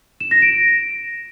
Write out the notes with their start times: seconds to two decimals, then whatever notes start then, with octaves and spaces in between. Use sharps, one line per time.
0.20 E7
0.31 A#6
0.42 D7